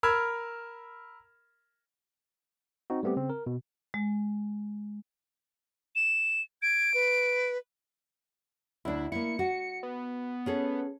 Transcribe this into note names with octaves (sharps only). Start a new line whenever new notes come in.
A#4 B5 E6 F6 G#6
C4 D#4 F#4
G3 A3 B3 C4 G4
C#3 C4
A#4
B2
G#3
E7
G#6 D7
B4
D2 D4 E4
A#3 E4 C#7
F#4
B3
C#4 G#4 A4